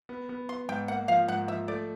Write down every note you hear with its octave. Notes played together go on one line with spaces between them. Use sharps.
B3
B3
B3 C6
G#2 G5
A#3 F#5
F3 F5
G#2 F#5
F3 E5
A3 D5